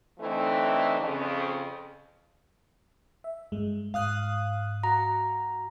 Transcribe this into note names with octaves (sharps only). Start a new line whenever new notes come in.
D3 E3 A3 C4 D#4
F2 C#3
E5
G2 G#3
G#2 F5 D#6 F#6
F#4 A#5